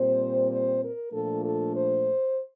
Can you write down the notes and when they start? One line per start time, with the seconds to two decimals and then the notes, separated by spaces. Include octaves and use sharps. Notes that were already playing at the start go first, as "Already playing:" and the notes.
Already playing: A#2 G3 C4 C5
0.51 C5
0.82 A#4
1.12 A#2 F3 A3 D4 A4
1.44 A4
1.75 C5